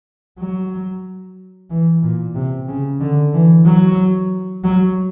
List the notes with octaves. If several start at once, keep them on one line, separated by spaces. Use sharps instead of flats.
F#3
E3
A#2
C3
C#3
D3
E3
F#3
F#3